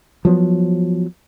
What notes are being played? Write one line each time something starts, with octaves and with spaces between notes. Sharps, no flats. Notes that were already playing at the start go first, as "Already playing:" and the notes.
F3 F#3 B3